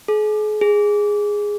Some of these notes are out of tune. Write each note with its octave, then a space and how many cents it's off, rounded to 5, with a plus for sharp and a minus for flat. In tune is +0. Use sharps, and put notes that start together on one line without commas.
G#4 +40
G#4 -5